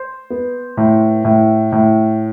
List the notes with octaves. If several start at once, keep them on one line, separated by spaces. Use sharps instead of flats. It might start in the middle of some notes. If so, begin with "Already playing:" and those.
Already playing: C5
B3
A2
A2
A2